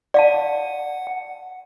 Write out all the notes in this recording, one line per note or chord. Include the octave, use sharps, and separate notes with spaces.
D5 F5 F#5 A5